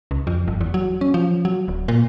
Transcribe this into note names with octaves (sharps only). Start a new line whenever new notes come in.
C#2
F2
G1
E2
F#3
C#4
F3
F#3
D1
A#2